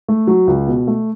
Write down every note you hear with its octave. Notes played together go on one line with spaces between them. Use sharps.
A3
F#3
C#2
B2
A3